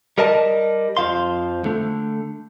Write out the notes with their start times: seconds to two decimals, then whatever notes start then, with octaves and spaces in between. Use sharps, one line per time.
0.18 G3 A#4 D#5 A5
0.97 F2 F3 F5 C6
1.64 D3 A3